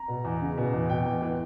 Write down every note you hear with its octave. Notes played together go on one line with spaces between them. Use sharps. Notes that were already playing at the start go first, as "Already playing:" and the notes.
Already playing: A#5
B2
E2
C#3
B2
E2
B2 G5
E2
E3